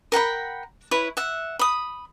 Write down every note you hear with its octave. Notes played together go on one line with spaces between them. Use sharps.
A#4 F#5 G5 B5
E4 B4 C#5
E5 F#5
B5 D#6